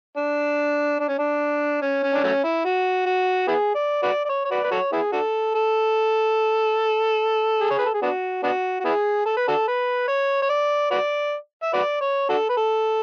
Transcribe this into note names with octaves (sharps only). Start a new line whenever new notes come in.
D4
D4
C#4
D4
C#4
C#4
D4
F#3 A3 C#4
E4
F#4
F#4
B3 E4 G#4
D5
F#4 B4 D5
D5
C#5
C#5
F#4 B4 D5
B4
F#4 A4 C#5
B3 E4 G#4
D4 F#4 A4
A4
G#4
C#5
B4
A4
G#4
B3 D4 F#4
B3 D4 F#4
F#4
B3 E4 G#4
A4
B4
D4 F#4 A4
B4
C#5
C#5
D5
F#4 B4 D5
E5
F#4 B4 D5
C#5
D4 F#4 A4
B4
A4